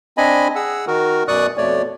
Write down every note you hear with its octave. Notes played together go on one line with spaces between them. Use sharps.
C4 D4 D#5 G#5 B5
G#4 F#5 E6
D#3 F#4 A#4
F#2 B2 D5 C#6 D#6 F#6
F2 B2 A3 C#5 D5